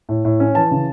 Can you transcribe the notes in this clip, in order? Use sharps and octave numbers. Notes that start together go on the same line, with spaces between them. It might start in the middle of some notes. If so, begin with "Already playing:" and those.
A2
A2
C#4
E3 A5
C#3